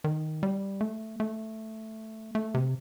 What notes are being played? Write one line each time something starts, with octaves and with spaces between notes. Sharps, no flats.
D#3
G3
A3
A3
A3
C3